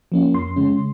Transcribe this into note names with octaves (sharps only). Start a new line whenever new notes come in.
F3 A#3 C#4
F2 C6
C#3 G#3 C#4